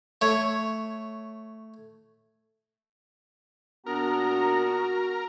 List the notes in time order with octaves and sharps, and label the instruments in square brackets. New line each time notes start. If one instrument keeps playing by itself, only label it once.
[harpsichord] A3 C#5
[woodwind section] A#2 D4 A#5 [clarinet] B3 [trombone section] F#4 [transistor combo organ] A#4